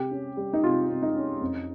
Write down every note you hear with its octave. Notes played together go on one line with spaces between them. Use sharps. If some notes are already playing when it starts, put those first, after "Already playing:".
Already playing: C3 G4
C#4
G3
D#4
C3 F4
C3
D#4
C#4
F2